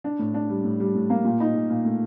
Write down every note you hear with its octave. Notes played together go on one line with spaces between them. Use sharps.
D4
A2
D4
G3
A2
G3
A2
A#3
A#2
D#4
A#2
A#2
A3